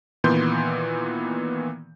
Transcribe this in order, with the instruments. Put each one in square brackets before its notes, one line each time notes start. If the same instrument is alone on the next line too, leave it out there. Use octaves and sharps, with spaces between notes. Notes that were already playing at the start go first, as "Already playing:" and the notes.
[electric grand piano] A#2 D#3 E3 B3 C6 G6